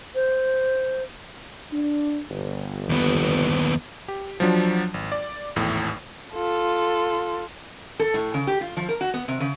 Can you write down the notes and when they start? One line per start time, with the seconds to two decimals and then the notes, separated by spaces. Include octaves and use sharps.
0.15 C5
1.72 D4
2.30 G1
2.89 D#2 B3
4.08 G4
4.40 F3 F#3 D4
4.94 G#1
5.12 D5
5.56 G#1 E2 A2
6.33 F4 A4
7.99 A4
8.14 A2
8.34 C#3
8.47 G4
8.61 F4
8.77 F3
8.89 A#4
9.01 F#4
9.14 B3
9.28 C3
9.40 C#3